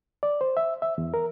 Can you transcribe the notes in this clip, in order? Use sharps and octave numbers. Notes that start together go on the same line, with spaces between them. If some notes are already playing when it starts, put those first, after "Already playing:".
D5
C5
E5
E5
E2
A#4